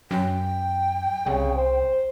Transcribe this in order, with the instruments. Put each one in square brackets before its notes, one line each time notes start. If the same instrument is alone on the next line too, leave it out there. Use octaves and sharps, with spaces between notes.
[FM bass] F#2 [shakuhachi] G5
[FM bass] C2 [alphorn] C#3
[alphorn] C5